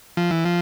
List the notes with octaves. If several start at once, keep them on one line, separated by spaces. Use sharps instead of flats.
F3
E3
F3